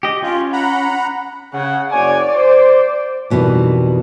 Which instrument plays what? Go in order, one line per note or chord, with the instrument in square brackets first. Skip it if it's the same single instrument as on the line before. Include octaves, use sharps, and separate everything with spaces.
[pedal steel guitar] G4 D#5
[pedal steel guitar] C#4 [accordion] F4
[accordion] F#5 A#5 B5
[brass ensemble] C#3 [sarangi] F#5
[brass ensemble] F#1 C#5 G#5 [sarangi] D5
[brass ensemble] C5
[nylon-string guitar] F2 B2 D#3 E3 G3